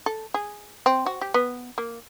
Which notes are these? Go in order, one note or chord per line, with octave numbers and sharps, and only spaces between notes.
A4
G#4
C4
F#4
G4
B3
A#3